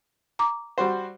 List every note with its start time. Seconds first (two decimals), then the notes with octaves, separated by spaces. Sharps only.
0.39 A#5 D6
0.78 G3 F#4 C5